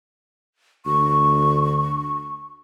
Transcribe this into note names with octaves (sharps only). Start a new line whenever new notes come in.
D2 C#6